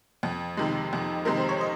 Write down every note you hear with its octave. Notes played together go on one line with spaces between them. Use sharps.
F2
C3 D#3 G#3
F2
C3 D#3 G#3 A#4
C5
C#5
D#5